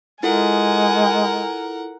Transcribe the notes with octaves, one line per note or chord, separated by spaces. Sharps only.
G#3 E4 F4 A4 A#4 F#5 G#5